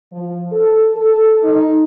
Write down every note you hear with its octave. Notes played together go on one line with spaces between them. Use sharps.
F3
A4
A4
D#4